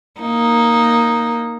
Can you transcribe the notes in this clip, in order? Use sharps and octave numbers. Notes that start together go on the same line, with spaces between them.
A#3 D#4